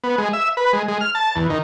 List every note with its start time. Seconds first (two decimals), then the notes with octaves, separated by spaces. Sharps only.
0.04 B3
0.18 G#3
0.33 E5
0.57 B4
0.73 G#3
0.88 G#3
1.01 F6
1.15 A5
1.36 E2
1.50 D#3